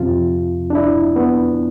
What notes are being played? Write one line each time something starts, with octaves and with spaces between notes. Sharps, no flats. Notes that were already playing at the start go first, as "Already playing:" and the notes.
Already playing: F2 C3 F3 F4
D4
E4
B3